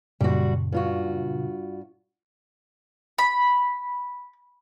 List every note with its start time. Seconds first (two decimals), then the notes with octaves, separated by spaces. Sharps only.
0.21 F#2 A#2 C#3 G3 F#4
0.72 G2 F4 F#4
3.18 B5